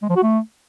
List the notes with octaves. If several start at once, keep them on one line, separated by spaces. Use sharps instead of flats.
G#3
F3
F#4
A3